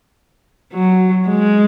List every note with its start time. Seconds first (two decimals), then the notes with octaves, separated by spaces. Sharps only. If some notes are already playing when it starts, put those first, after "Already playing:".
0.73 F#3
1.28 G#3